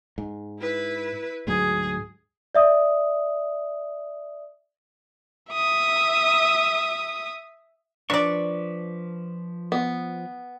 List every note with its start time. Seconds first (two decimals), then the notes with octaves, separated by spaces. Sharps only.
0.18 G#2
0.60 E4 B4
1.47 D2 G#2 F#3 G#4
2.55 D5 E5 D#6
5.53 E5 D#6
8.10 F3 D4 B4 D5 C#6
9.72 B3